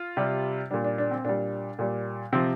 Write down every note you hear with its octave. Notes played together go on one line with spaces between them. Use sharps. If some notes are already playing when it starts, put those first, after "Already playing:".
Already playing: F4
C3 G3
A#2 G3 D4
D4
D4
C4
A#2 G3 D4
A#2 G3
C3 F3 C4